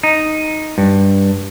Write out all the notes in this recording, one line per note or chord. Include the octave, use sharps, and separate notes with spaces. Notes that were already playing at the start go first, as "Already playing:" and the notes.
D#4
G2